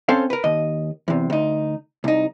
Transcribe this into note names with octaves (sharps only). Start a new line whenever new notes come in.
C4 C#4 A4 C5 F5
A#4 B4
D#2 D#5
E2 C3
D2 D#4
C2 D#4